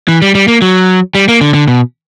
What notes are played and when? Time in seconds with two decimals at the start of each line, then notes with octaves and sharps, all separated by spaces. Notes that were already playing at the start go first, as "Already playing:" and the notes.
0.08 E3
0.22 G3
0.35 G3
0.48 A#3
0.62 F#3
1.15 G3
1.29 A#3
1.41 D3
1.54 D3
1.68 B2